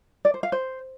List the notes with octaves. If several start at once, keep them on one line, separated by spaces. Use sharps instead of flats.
D5
C5
F5
C5